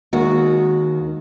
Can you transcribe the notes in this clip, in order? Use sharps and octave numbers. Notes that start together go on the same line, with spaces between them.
D#2 D#3 G#3 F#4